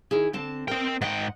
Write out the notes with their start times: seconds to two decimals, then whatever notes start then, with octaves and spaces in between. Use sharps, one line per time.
0.11 D#3 E4 G#4
0.33 D3 C4 A5
0.68 C4 A#4 C5 D#5 G5
1.01 G#2 D#5 F#5 G5